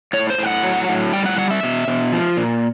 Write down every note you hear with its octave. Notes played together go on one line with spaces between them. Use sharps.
A2 C#5
C5
A2 G5
F#5
F#3
A2
G3 G5
F#5
G3 F#5
E5
B2
B2
F3
A#2